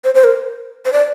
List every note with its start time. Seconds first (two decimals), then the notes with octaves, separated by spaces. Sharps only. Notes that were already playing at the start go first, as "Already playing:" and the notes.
0.04 C5
0.15 C5
0.24 A#4
0.85 C5
0.93 D5